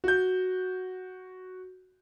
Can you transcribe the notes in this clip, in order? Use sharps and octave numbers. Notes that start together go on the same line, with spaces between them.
F#4 G6